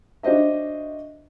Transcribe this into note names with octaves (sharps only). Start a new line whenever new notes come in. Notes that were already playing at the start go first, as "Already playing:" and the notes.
D4 F#4 C5 D#5 E5